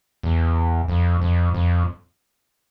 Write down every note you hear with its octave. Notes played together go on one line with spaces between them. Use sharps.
E2
F2
F2
F2